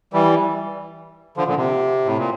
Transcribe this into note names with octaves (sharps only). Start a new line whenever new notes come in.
E3 G3
D3 F3
A#2 D3
C3
A2
A#2